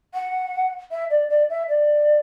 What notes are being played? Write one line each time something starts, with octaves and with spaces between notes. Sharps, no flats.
F#5
E5
D5
D5
E5
D5